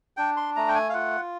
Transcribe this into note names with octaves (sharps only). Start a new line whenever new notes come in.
D4 G5
C6
A3 A#5
G5
G#5
F5
F4 F#5